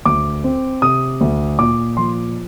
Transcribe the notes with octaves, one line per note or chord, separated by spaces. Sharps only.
D2 D6
C4
C3 D#6
D2
A#2 D6
F3 C6